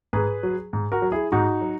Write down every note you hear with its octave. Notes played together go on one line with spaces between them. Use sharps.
G#2 G#4 B4
F#3
G#2
F#4 A#4
F#3
E4 G#4
G#2 D#4 F#4
F#3